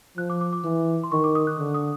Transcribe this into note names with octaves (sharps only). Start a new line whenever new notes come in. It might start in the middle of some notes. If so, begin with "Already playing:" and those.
F3 F#6
D6
D6
D6
E3
C6
D#3 C#6
D6
D#6
F#6
D3
D#6